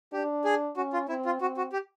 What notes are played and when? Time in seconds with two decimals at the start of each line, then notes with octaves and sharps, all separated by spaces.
0.13 D4 G4
0.45 G#4
0.77 C#4 F#4
0.93 F4
1.09 C4 E4
1.26 F4
1.41 C4 F#4
1.57 F#4
1.73 G4